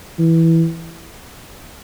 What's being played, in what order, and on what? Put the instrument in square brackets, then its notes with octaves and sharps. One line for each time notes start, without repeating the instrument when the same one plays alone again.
[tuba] E3